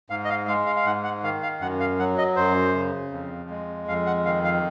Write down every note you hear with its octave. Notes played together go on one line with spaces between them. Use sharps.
G#2 F5
D#5
F5
G#3 F5
F5
F5
G#2 F#5
F#5
D#3 F5
F5
F#2 F#5
F5
F#3 F#5
D#5
F#2 C5
C#3
F2
G#3
F2 F5
F#5
D#3 F5
F5